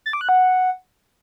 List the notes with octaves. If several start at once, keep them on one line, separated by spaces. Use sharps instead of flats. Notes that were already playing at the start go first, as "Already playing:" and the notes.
A6
D6
F#6
F#5